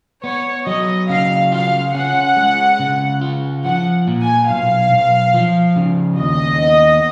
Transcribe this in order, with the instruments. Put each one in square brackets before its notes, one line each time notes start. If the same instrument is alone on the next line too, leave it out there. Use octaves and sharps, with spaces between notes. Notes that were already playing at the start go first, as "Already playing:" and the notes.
[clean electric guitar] B3 [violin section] C#5
[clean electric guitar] F#3 [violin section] D#5
[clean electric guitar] C#3 [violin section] F5
[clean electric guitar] F4 [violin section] F5
[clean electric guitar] C#4 [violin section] F#5
[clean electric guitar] G#3
C#3
F4
[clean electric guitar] F3 [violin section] F#5
[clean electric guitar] A#2
[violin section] G#5
[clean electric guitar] B1 [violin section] F5
[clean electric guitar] B1
F3
C#3
[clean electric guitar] D#2 [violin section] D#5
[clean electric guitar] B3